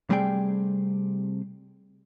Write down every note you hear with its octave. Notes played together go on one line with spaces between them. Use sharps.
C3 G3 A3 C4 G#4 G5